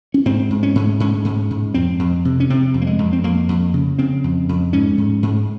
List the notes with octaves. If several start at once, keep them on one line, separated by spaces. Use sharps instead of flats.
C#4
G#2 C4
G#2
C#4
G#2
G#2 C#4
G#2
G#2
F2 C4
F2
C3
C#4
C3 C4
F2
A#3
G#3
F2
C4
F2 A#3
F2
C#3
C#3 C4
F2
F2
G#2 C#4
G#2
G#2